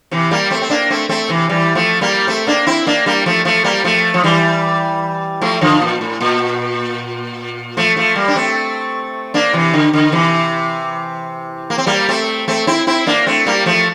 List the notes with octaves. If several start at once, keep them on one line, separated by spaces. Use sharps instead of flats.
C3 E3
G3 A#3
A3 C4
C4
A#3 D4
A3 C4
A3 C4
C3 E3
E3 G3
F3 A3
G3 A#3
A3 C4
A#3 D4
C4 E4
A#3 D4
G3 A#3
F3 A3
F3 A3
G3 A#3
F3 A3
F3
E3 G3
F3 A3
D3 F3
A#2
A2
A#2
F3 A3
F3 A3
G3 A#3
D4
A3 C4
A#3 D4
C3 E3
D3
D3
C3 E3
A#3
C4
G3 A#3
A3 C4
A3 C4
C4 E4
C4 E4
A#3 D4
A3 C4
G3 A#3
F3 A3